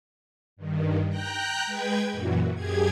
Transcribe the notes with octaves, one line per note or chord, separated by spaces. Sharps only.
G2 D#3
G5 A#5 F#6 G6
G#3 B4 G5 G#6
F#2 A#2 E3 F#3
F#2 G4 G#4 G#6